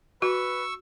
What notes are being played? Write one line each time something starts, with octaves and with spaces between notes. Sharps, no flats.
F#4 B4 C#6 E6